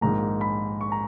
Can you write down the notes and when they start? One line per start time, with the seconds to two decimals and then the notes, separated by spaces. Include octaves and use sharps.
0.01 A#1 G#2 D#3 A#3 A#5
0.41 B5
0.81 C#6
0.92 A#5